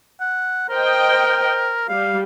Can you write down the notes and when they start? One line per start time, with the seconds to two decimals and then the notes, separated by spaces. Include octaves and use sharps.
0.20 F#5
0.69 A#4 C5 D#5 G5
1.88 G3 F5